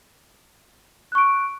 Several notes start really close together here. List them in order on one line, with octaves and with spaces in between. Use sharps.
F#6 C#6 D7